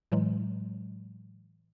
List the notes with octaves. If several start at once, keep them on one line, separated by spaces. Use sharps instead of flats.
A2 E3 F#3 G#3